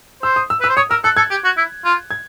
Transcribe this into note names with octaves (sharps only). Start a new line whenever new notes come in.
C5 E6
D#6
E6
B4 E6
C5
C#5 D#6
A#4 E6
A4 F#6
A4 G#6
G4
F#4
E4
F4
G#6